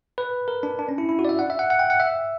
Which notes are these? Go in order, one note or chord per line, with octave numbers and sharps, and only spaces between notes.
B4
A#4
D4
D4
C#4
E4
E4
F#4
D5
E5
F#5
E5
F#5
F#5
G5
F#5
E5